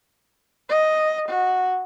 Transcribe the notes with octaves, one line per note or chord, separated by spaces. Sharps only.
D#5
F#4